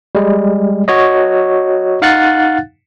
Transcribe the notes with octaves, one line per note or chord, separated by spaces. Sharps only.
G3 G#3
F#4 C#5 D#5
D#4 F5 F#5 F#6 A6